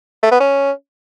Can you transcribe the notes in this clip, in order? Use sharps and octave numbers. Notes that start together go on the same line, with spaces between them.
A3
B3
C#4